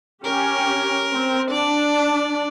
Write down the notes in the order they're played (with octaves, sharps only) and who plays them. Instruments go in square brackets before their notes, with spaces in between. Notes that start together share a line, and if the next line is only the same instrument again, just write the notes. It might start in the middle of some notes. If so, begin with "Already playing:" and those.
[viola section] C#4 G4 [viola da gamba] A#4
[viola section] C4
[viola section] D4 [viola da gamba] D5